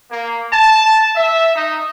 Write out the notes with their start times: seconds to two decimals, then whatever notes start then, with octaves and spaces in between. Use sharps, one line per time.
0.11 A#3
0.53 A5
1.16 E5
1.56 D#4